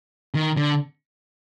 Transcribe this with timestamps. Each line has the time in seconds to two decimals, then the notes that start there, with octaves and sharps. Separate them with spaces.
0.35 D#3
0.57 D3